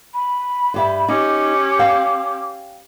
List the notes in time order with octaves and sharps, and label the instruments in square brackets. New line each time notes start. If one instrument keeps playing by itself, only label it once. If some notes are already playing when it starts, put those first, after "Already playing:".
[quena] B5
[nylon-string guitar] G2 G4 E5
[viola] C#4 G4 [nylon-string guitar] D#4 [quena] D6
[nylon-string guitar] F5 G5